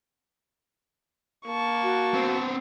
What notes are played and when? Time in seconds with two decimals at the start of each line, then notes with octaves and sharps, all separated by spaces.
1.46 A#3 A5 C#6
1.83 F#4
2.14 B3 C4